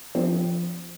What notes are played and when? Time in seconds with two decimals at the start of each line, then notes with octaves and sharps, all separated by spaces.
0.15 F3 C4 C5